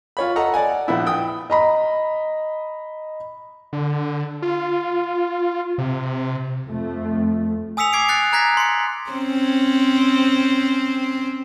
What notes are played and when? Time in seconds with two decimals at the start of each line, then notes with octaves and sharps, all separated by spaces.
0.17 F4 C#5 B5
0.36 A4 D#5 F#5 A#5
0.54 D5 F#5 G#5
0.88 A#1 B3 E4
1.07 G5 D#6
1.50 D#5 A#5 B5
3.73 D3
4.42 F4
5.78 C3
6.66 F2 A3
7.77 G#5 D#6 E6 B6 C#7 F7
7.93 D6 G#6 C7 D7
8.08 F#6 A6 C7 C#7
8.33 A#5 F#6 G#6 A#6 B6
8.57 C6 C#7
9.10 C4 C#4